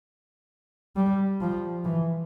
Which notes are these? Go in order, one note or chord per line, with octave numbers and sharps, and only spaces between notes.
G3
F3
E3